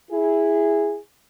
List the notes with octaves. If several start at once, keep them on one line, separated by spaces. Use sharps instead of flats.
E4 G#4